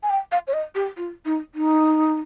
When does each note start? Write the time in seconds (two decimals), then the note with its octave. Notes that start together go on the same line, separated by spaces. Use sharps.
0.03 G#5
0.10 G5
0.32 F5
0.47 C#5
0.53 D#5
0.75 G4
0.97 F4
1.25 D#4
1.55 D#4